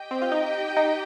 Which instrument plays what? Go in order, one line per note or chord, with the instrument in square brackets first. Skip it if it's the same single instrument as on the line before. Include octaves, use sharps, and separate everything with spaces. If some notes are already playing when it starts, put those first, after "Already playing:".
Already playing: [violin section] G4 D#5 G5
[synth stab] C4
F4
D#4
D#4